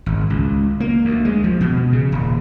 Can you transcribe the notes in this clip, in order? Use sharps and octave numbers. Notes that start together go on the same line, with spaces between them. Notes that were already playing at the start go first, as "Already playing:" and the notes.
G#1
C#2
A#3
D2
G#3
F3
B2
C#3
D#1